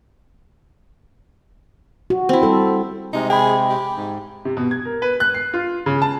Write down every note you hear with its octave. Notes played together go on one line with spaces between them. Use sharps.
F#4
C4 E4
G3 A4 C5
C3 G#3 D#4
G#4 G5 B5
G4
G#2
C3
B2
G#6
A#4
B4
F#6
C7
F4
C#3
A5